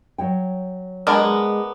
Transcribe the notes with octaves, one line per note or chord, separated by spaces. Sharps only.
F#3 C#5 G5
G#3 B3 D4 A#4